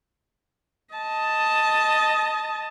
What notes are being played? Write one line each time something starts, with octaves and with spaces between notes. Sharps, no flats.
D#5 A5